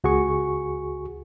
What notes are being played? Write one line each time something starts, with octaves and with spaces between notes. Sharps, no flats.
C#2 F#4 G#4 C#6